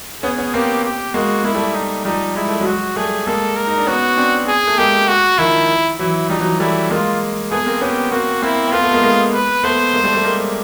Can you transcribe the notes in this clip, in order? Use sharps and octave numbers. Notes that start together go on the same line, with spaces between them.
B3 C#4 G#4
B3 C#4
A#3 C4 G4
G4
G#3 A#3 F#4
G#3 A#3 E4
G3 A3
D#4
F3 G3 D#4
G#3 E4
A3
F#3 G#3
F#4
G3 A3 G#4
G#3 A#3 A4
A#4
D#4
D4
B3 C#4 F#4
C4 D4
G#4
A3
G#3 A#3 G4
F#4
D#3 F3 E4
E3 F#3 E4
F3 G3 D#4
E3 F#3
G3 A3 E4
G#3 A#3 F4
A3 B3 G#4
A#3 C4
B3 C#4 G4
A#3 C4 F#4
A#3 C4 E4
C4
A3 B3 F4
A3 B3
G#3 A#3
G#3 A#3
B4
A3 B3 C5
G#3 A#3
G3 A3
G3 A3
G#3 A#3